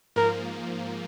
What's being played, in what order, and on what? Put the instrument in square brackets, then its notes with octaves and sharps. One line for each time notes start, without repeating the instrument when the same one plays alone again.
[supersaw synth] G#2 F3 A#3 [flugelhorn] A#4